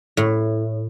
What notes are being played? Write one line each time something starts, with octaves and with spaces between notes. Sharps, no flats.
A2